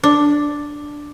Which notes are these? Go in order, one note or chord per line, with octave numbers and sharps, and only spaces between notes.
D4